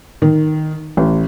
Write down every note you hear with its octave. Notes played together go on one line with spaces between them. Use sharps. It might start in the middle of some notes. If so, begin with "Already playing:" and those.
D#3
A1